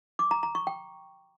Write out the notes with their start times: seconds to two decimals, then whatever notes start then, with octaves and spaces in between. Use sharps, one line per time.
0.19 D6
0.31 A#5
0.43 A#5
0.55 C#6
0.67 G5